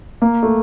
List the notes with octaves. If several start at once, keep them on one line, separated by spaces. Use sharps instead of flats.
A#3
A3